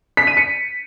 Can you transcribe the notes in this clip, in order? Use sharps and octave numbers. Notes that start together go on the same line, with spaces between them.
B6
D#7
C#7